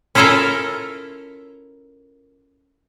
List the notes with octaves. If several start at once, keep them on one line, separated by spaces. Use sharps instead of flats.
C#4 E4 F4 A4 A#4 E5